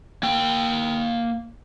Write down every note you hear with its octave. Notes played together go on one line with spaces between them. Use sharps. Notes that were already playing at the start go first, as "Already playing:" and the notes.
A#3 G5